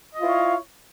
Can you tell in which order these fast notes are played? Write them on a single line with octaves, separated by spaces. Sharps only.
D#5 F4 F5 E4 C#5